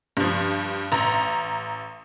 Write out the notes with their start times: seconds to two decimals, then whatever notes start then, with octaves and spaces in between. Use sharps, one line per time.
0.17 G2 F3
0.92 A1 A#5